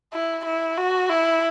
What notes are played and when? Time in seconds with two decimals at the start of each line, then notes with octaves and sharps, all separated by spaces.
0.13 E4
0.45 E4
0.78 F#4
1.10 E4